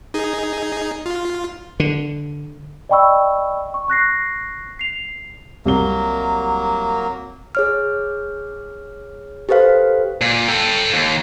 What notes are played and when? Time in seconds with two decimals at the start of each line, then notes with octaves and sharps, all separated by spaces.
0.14 D#4 G#4
1.06 F4
1.80 D3
2.89 D5 D#5 G5 B5 C#6 E6
3.74 C#6
3.88 C#6 F#6 A#6 C7
4.79 C7 F7
5.65 C2 F#3 A#3 G7
7.55 G#4 C#5 F6
9.49 G4 A4 B4 C5 F5
10.21 A#2
10.49 A4 G5
10.92 D#2